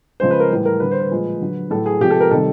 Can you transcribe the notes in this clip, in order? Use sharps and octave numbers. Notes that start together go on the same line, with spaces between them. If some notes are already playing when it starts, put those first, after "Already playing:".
C#3 F3 G#3 C5
B4
A#4
A2 E3 G3
A#4
D3 G3 B4
C5
B4
A#2 F3 G#3
D3 F#3
A2 F#3 A4
G#4
C3 F3 G#3 G4
A4
A#4
C3 D#3 G3 A4